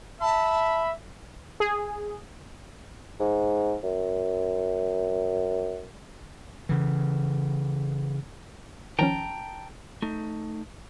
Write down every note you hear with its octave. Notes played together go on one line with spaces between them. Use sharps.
E5 A5 B5
G#4
G#2
F#2
C#3 E3
D#3 F3 C#4 G5 A5 A#5
A3 D#4